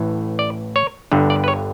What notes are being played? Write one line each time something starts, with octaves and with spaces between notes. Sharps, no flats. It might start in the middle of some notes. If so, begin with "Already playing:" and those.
Already playing: A1 A2 E3
D5
C#5
G1 G2 D3
D5
B4
C#5